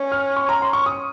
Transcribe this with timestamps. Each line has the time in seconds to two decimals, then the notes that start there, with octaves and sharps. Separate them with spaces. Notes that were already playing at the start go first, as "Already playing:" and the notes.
Already playing: C#4
0.12 F6
0.36 C#6
0.49 A#5
0.62 C6
0.73 C#6
0.86 D#6